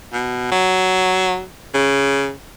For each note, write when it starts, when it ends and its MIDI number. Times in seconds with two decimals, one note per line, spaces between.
0.13 0.49 47
0.52 1.43 54
1.74 2.31 49